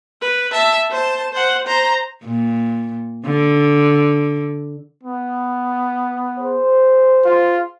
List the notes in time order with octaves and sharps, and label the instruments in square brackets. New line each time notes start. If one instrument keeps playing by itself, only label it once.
[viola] B4
E5 A5
C5 A5
C5 F#5
C5 A#5
[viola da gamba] A#2
D3
[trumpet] B3
[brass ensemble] G#4 C5
[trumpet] F4